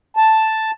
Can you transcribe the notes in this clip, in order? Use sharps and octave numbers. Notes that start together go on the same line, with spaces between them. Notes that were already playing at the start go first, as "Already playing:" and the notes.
A5